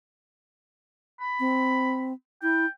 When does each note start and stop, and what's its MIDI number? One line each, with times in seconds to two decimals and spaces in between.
1.21 2.10 83
1.40 2.13 60
2.43 2.66 64
2.43 2.67 79